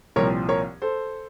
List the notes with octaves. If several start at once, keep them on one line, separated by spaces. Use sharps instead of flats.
C2 A#2 F3 C4 A#4 C#5
A#4 C#5
A4 C5